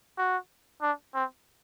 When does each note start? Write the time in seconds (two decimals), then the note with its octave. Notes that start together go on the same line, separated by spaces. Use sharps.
0.18 F#4
0.82 D4
1.14 C4